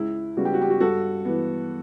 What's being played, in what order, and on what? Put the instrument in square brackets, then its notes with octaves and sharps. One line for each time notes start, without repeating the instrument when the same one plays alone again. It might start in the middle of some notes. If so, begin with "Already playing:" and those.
Already playing: [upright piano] C#2 E4
C#3 G3 B3 F#4
G4
F#4
G4
F#4
G2 F#4 A4
E3 B3